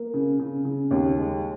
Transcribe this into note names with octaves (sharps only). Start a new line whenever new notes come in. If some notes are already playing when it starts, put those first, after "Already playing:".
Already playing: A#3
C#3
C#3
C#3
D#2
G#3